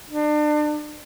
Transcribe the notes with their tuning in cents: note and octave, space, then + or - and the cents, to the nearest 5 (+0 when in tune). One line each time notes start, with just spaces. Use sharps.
D4 +35